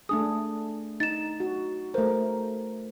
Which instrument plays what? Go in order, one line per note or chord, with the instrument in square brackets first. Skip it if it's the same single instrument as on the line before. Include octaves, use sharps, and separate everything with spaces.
[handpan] A3 D4 G#4 [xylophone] D#6
[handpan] D#4 [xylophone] A6 E7
[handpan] F#4
[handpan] A3 A#4 [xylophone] C5